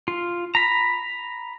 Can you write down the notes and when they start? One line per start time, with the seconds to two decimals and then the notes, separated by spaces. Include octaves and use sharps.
0.08 F4
0.55 A#5 B5